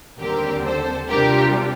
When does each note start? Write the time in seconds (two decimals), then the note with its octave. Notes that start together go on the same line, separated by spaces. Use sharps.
0.19 D#2 D3 G3 C4 G4 A#4
0.64 A4 C5
1.09 C3 G3 D4 F4 G4 A#4